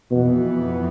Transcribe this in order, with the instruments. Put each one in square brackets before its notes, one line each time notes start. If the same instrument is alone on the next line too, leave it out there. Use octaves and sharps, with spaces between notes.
[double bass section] F2 E3 B3 [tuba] B2